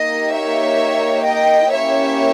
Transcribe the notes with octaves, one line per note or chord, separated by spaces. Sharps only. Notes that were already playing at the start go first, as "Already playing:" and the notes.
Already playing: A#3 D#4 G4 D#5
C#5 E5
D#5 G5
A#3 C#4 E4 G4 C#5 E5